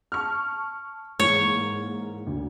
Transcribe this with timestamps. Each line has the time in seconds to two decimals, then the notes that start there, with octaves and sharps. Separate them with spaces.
0.12 A5 C#6 F6
1.20 G#2 E3 A#3 C#5
2.27 D2